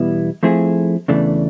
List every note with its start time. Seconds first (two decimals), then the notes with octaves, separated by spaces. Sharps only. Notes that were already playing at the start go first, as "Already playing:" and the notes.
Already playing: E2 B2 G3 B3 E4
0.43 F3 A3 C4 E4 G#4
1.08 E2 C#3 E3 A3 D4